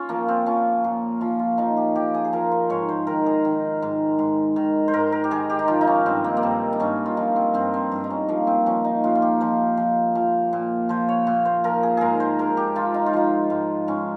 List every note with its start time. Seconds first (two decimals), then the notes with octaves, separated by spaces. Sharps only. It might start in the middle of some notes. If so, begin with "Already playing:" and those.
Already playing: C#4 F4
0.09 F3 A#3
0.28 C4
0.46 F3 C#4
0.84 A#2
1.21 F3 F4
1.39 F4
1.58 F3 D#4
1.77 G4
1.95 F3 G4
2.14 G#4
2.24 G#4
2.33 F3 A#4
2.52 C5
2.70 G#2 C#5
2.89 C5
3.07 D#3 A#4
3.26 G#4
3.45 D#3
3.82 G#2
4.19 G#2
4.56 D#3
4.88 C5
4.94 G#2 A#4
5.12 A#4
5.24 G4
5.31 D#3 G#4
5.50 G4
5.59 D#4
5.68 F3 F4
5.81 D#4
5.87 C#4
6.06 G2 C4
6.24 A#3
6.37 A#3
6.43 G2 C4
6.73 D#4
6.80 G2 C#4
7.06 F4
7.17 F3 D#4
7.36 C4
7.54 G2 C4
7.74 C4
7.92 G2
8.04 D#4
8.10 C#4
8.29 F3 A#3
8.47 C4
8.66 F3 C#4
8.85 D#4
9.04 A#2 F4
9.15 F4
9.22 G4
9.41 F3 C5
9.77 F3
10.15 F3
10.53 A#2
10.89 F3 C5
11.09 C#5
11.27 A#2
11.45 C5
11.64 F3 A#4
11.83 G#4
11.97 G#2 G#4 A#4
12.20 C5
12.39 G#2 A#4
12.57 G4
12.75 F3 F4
12.94 D#4
13.06 F4
13.13 F3 D#4
13.50 G#2
13.88 G#2 C#4